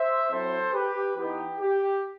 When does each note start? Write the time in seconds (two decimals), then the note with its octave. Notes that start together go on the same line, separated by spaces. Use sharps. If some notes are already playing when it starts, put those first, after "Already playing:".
Already playing: C5 E5
0.31 F#3 C4 E4 A4 C5
0.73 G4 B4
1.16 E3 B3 D#4 G4
1.60 G4